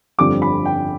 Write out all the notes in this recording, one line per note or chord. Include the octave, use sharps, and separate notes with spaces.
G1 F2 D3 G3 C4 D6
B5
G5